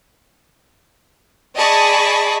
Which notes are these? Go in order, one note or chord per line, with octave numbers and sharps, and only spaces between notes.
G#4 D5 D#5 A5 B5 C#6